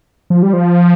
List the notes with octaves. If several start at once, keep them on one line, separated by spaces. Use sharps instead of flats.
F3
G3
F3